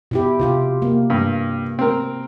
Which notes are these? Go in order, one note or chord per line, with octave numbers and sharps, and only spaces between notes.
B2 E4 G4
C3 F4 G4
A#3
G2
C4 A#4